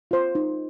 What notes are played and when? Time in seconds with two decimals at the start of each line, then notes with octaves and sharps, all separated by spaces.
0.11 F4 C5
0.35 D#4